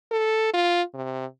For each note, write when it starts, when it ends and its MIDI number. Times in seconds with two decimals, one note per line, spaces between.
0.11 0.53 69
0.54 0.82 65
0.94 1.26 48